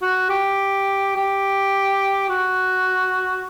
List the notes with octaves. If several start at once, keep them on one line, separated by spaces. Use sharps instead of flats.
F#4
G4
G4
F#4